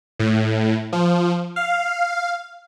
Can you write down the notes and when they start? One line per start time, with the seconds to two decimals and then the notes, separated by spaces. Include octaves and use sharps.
0.19 A2
0.93 F3
1.56 F5